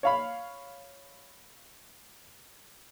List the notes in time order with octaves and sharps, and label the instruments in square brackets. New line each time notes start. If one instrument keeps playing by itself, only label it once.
[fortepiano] C#5 F5 B5